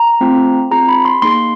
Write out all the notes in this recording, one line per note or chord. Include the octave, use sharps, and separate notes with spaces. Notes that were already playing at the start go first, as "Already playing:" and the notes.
Already playing: A#5
A3 C4 F4
C4 F4 G#4 A#5
B5
C6
A#3 D#4 G#4 C6